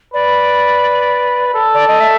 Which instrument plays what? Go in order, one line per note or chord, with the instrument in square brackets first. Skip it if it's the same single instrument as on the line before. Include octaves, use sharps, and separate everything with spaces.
[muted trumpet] B4 [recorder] D5
[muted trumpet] A4
[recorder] D5
D#5
E5